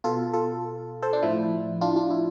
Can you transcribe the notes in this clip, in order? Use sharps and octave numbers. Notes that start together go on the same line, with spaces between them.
B2 F4 A4
F4 A4
A4 C5
D4
A2 F3 E4
D4 F4
D4 F4
E4